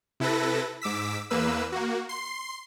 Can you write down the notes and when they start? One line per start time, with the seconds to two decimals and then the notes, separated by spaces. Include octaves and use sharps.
0.20 C3 E4 A4 B4 A#6
0.81 G#2 D6 E6 B6
1.30 E2 A#3 B4 E6
1.72 A#3 F#4
2.09 C6 C7